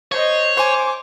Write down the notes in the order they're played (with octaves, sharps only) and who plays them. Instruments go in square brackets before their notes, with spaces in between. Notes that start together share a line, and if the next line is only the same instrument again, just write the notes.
[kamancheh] C5 D#5 [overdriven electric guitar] C#5
[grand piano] C5 G#5 [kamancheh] D6